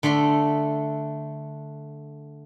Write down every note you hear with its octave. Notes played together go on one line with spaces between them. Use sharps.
D3 A3 E5 C6